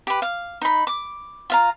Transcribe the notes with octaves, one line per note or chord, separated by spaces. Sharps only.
G4 B4
F5
D#4 B5
D6
F4 F5 A#5